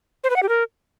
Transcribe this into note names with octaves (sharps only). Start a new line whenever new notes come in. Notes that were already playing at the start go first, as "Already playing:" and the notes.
C5
B4
F#5
G4
A#4